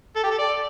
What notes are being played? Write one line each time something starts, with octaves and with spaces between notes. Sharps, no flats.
A4
G4
A4
D5